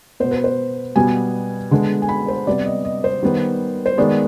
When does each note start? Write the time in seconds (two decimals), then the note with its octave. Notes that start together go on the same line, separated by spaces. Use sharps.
0.20 B2 B3 C5
0.31 B4
0.44 C5
0.96 B2 G3 B3 G#5
1.71 D3 G#3 B3
2.02 G#5
2.09 B5
2.28 C5
2.47 C3 G3 B3 D5
2.66 D#5
2.85 D#5
3.04 C5
3.22 D#3 G3 B3
3.86 C5
3.98 D#3 G#3 B3 D5